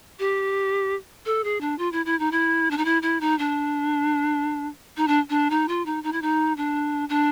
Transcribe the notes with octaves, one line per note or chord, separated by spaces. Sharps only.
G4
A4
G#4
D4
F4
E4
E4
D#4
E4
D4
D#4
E4
E4
D#4
D4
D#4
D4
D4
D#4
F4
D#4
D#4
E4
D#4
D4
D4